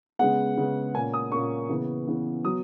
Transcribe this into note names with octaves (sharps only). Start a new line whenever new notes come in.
C#3 G#3 B3 F#5
C#3 G#3 B3
A#2 A#3 C#4 G#5
D#6
A#2 A#3 C#4 C#6
C#3 E3 B3
C#3 E3 B3
F#3 B3 D#6